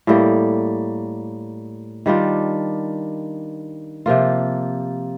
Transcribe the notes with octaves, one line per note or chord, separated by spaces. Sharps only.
A2 G3 A#3
D#3 G3 D4 F4
C3 F3 A#3 F4